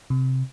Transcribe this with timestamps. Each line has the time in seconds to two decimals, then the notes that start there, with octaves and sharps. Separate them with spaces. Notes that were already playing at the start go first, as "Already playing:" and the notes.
0.10 C3